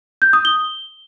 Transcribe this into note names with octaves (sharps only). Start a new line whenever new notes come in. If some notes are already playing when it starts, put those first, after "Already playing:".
G6
D#6
G7